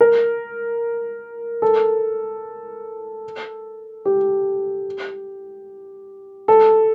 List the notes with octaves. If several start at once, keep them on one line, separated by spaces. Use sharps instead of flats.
A#4
A4
G4
A4